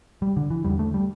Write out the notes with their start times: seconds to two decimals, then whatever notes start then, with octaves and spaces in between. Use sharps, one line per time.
0.22 G3
0.37 D3
0.50 E3
0.65 E2 D3 G3
0.79 A3
0.94 G3